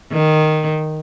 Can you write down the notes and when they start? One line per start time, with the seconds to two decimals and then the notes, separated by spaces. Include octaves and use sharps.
0.12 D#3